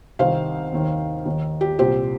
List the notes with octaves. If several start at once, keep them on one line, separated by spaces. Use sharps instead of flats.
C2 C3 D#3 C5 F5
D#2 D#3
D#2 D#3
G4
C2 A#2 G4 C5